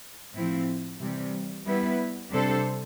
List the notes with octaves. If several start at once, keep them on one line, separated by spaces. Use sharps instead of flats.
A2 F3 C4 E4
C3 E3 G3
G3 B3 E4 B4
C3 G3 D4 A4 C5